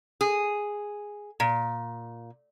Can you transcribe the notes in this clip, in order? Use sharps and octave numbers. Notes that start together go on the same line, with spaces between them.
G#4
A#2